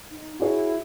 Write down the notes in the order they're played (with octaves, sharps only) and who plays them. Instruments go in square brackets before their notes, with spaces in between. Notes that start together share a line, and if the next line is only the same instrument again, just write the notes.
[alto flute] D#4
[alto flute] E4 [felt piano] F#4 G#4 C#5